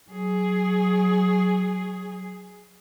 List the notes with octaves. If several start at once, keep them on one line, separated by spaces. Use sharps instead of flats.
F#3 G#4